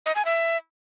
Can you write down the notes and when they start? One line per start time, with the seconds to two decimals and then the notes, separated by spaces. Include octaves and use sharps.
0.06 D#5
0.15 G#5
0.25 E5